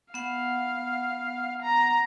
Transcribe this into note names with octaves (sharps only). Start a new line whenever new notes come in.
B3 F5 F#5
A#5